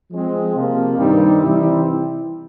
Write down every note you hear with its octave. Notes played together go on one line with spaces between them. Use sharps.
F3 G#3 C4
C3 F3 A#3
G2 D#3 G3 C4 D#4
C3 E3 G3 C4 E4